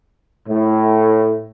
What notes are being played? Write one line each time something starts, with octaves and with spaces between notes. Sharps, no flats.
A2